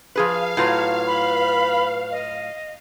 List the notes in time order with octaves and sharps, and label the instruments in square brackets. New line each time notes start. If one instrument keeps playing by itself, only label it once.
[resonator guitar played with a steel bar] F3 G#4 B4 [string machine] F5
[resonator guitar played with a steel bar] A2 F#3 F4 [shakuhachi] B4
[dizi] B5
D#5